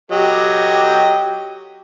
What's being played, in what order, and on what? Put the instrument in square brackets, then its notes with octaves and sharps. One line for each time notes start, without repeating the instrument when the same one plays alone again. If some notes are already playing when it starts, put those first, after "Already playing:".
[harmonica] F#3 D#5 [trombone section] G4